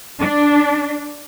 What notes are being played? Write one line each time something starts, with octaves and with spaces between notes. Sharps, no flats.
D4